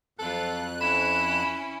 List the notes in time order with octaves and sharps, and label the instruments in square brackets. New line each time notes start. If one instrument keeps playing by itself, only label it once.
[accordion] F2 F#6 [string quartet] F#3 F4 [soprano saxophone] A4
[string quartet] C#4 E4 [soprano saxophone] B5 [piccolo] E7